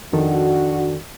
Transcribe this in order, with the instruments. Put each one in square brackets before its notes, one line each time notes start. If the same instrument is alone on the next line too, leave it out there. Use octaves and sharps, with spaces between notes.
[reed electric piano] F2 D#3 A4 [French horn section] D4 F#4